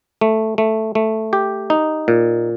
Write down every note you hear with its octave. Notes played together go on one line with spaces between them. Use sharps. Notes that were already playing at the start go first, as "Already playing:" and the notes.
A3
A3
A3
G4
D#4
A#2